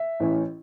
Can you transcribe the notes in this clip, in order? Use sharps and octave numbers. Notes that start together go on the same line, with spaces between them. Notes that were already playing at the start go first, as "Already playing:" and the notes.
Already playing: E5
A1 A2 E3 C#4